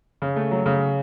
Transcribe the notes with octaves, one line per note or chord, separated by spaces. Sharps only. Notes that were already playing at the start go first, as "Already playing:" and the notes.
C#3
A3
F#3
C#3